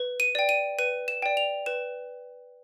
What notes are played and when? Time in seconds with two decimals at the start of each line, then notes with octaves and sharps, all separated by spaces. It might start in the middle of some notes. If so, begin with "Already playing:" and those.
Already playing: B4
0.20 D#7
0.35 D5 G5
0.49 D#7
0.79 B4 D#7
1.08 E7
1.22 D5 G5
1.37 F7
1.66 B4 E7